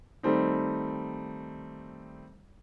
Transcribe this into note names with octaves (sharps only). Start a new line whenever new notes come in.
D#3 G3 A3 C4 D#4